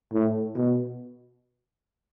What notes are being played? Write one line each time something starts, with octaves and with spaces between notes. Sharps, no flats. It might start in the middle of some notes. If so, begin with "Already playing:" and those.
A2
B2